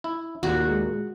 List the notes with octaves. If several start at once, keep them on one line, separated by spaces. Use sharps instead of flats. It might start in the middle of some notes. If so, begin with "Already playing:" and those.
E4
D#2 A#2 A#3 F#4
G#3